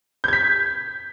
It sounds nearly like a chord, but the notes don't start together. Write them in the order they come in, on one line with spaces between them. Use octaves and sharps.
G6 G#6 B6